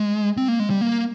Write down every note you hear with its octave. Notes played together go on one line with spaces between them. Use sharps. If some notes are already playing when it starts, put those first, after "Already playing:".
Already playing: G#3
C4
A#3
G#3
G3
A#3